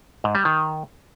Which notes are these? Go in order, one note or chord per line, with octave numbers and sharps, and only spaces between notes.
G#2
G3
D#3